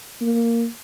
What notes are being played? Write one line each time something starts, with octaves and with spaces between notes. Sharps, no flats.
A#3